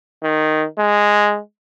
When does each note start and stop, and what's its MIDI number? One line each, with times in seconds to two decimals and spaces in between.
0.23 0.66 51
0.79 1.39 56